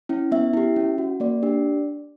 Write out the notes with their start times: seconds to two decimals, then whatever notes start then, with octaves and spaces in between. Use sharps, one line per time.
0.09 C#4 E4
0.32 B3 E5
0.53 E4 G4
0.76 C#4
0.98 F#4
1.20 A#3 D5
1.43 D4 G4